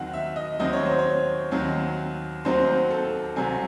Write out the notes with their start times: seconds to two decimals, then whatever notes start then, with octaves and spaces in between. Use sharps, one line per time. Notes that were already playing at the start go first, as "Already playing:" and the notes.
Already playing: D#2 D#3 F#3 C4 F#5
0.13 E5
0.36 D#5
0.59 D#2 D#3 F#3 C4 D#5
0.73 C#5
0.86 C5
0.98 C#5
1.51 D#2 D#3 F#3 C4
2.45 D#2 D#3 F#3 C4 C5
2.91 A4
3.36 C2 C3 F#3 C4 G#5